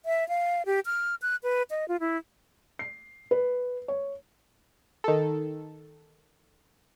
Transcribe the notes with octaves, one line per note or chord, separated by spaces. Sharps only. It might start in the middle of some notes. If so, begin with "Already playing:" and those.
E5
F5
G4
F6
F#6
B4
D#5
F4
E4
C7
B4
C#5
D#3 A4